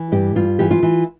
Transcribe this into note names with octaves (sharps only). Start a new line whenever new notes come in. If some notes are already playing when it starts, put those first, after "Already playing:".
Already playing: E3
G2 G4
G2 F4
E3 G4
F4
E3